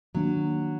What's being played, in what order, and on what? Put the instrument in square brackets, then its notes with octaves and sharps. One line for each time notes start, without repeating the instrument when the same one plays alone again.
[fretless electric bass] D#3 A#3 D4 [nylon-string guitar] F#3